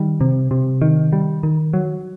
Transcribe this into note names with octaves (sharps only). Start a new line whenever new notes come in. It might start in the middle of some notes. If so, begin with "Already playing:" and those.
Already playing: D#3 G3
C3
C3
D#3
G3
D#3
F#3